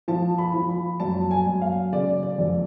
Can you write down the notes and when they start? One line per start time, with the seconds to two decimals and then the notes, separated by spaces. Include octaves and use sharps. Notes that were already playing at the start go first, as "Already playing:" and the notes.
0.08 F3 A5
0.38 B5
0.54 F3
0.69 B5
1.00 F#2 A5
1.31 G#5
1.46 F#2
1.62 F5
1.92 C#3 D5
2.23 D5
2.39 F2